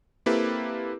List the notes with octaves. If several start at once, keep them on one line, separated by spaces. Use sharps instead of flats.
A#3 C4 E4 G4 A4 B4